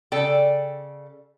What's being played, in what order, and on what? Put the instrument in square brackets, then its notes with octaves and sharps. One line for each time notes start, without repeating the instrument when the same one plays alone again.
[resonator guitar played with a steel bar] C#3 A4 D5 G5